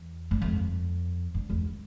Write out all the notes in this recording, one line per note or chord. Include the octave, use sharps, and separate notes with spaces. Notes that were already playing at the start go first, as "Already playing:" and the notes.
Already playing: E2
G2
F2
G2
E2